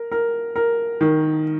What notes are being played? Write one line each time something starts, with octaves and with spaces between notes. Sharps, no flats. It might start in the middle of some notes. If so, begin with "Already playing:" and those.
Already playing: A#4
A#4
A#4
D#3